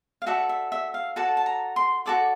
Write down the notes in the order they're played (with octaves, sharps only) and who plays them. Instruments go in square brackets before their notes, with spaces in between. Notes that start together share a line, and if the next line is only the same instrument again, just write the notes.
[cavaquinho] F5
F#4 A4 D5 E5
E5
E5
F5
F#4 A4 D5 A5
A5
A#5
C6
F#4 A4 D5 D6